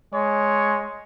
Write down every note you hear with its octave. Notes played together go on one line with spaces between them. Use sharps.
G#3 C#5